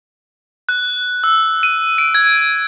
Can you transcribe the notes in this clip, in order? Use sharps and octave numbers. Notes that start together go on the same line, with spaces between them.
F#6
E6
D#7
D7
G#6